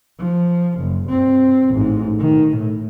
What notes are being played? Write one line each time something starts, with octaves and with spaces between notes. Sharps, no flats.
F3
F#1
G2 C4
A1 G#2
D#3
A2